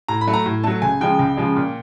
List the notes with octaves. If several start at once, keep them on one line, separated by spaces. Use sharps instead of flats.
A2 A#5
B5
F#3 A3
A#5
A2
F#3 A3 A5
C#2 G#5
C#3 F3 G#3 G5
C#2
C#3 F3 G#3
A#2